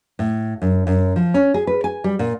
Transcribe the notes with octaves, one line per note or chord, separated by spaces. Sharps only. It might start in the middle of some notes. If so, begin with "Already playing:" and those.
A2
F#2
F#2
F3
C#4
G#4
B4
G#5
G3
A#2